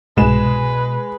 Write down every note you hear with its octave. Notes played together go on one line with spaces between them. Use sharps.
C2 G#2 B2 G#3 B4 E7